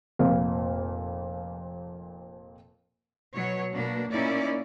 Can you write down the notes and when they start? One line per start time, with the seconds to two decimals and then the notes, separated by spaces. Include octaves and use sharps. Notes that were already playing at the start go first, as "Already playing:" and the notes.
0.19 F1 F2 A#2 F5
3.34 B2 F#3 C#5
3.73 B2 A#3 D4
4.10 A#2 A#3 C#4 D#4 E4 D5